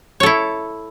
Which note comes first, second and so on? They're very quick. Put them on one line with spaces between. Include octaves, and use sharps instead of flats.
C#5 A4 E4